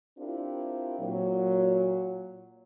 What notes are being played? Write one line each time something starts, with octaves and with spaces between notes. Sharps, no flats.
C4 D4 E4 F4 G4 A#4
A#2 F#3